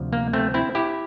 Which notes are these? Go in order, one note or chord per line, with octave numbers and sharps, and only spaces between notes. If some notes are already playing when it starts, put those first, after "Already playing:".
Already playing: D2 C3 F3
A#3
A3 C4
C4 E4
E4 G4